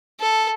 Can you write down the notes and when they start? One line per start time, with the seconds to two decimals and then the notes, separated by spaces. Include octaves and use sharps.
0.20 A4